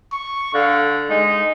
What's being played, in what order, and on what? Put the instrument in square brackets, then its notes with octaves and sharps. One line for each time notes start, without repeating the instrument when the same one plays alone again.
[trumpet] C#6
[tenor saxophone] D3 [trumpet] F5
[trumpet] G#3 [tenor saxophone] D#4